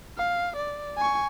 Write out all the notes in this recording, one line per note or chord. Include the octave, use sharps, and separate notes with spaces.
F5
D5
G#5 C#6